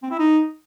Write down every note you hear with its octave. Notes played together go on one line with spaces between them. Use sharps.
C4
E4
D#4